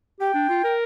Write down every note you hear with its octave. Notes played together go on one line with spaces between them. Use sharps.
G4 G5
D4
F4
A#4